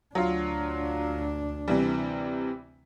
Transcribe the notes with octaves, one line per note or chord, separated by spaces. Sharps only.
D2 F#3 D4 F4
C3 E3 G3